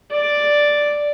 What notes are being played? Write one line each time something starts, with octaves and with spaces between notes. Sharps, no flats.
D5